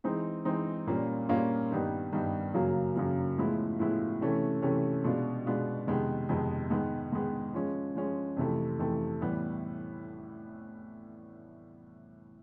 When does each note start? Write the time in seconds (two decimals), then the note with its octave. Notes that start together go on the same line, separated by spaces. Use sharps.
0.04 E3 G#3 C4 D#4
0.45 E3 G#3 C4 D#4
0.87 A#2 G3 A#3 C#4 F4
1.29 A#2 G3 A#3 C#4 F4
1.71 G2 D#3 G3 B3 D#4
2.13 G2 D#3 G3 B3 D#4
2.54 F#2 C#3 F#3 A#3
2.96 F#2 C#3 F#3 A#3
3.37 A2 F3 G#3 B3 E4
3.79 A2 F3 G#3 B3 E4
4.21 C3 E3 A3 C#4
4.62 C3 E3 A3 C#4
5.04 B2 G#3 B3 D4 F4
5.46 B2 G#3 B3 D4 F4
5.87 F2 C3 D#3 G#3 B3
6.29 F2 C3 D#3 G#3 B3
6.70 G#2 D#3 G#3 B3
7.12 G#2 D#3 G#3 B3
7.54 F3 G#3 C#4
7.95 F3 G#3 C#4
8.37 F2 C3 E3 A3
8.79 F2 C3 E3 A3
9.21 A2 E3 G3 B3